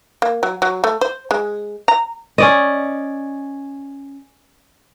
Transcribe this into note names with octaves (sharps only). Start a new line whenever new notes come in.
A#3
F#3
F#3
A3
C5
G#3
A#5
C#4 D5 D#5